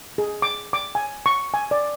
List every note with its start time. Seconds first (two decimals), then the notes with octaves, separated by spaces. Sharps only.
0.18 G#4
0.42 D6
0.73 D6
0.95 G#5
1.26 C#6
1.54 G#5
1.71 D5